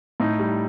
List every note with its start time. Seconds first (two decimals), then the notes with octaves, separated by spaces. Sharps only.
0.20 A2 D#4
0.39 G3